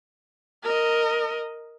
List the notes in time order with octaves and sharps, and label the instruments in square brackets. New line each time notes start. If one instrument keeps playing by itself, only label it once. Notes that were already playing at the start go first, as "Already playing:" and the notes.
[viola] A#4 D#5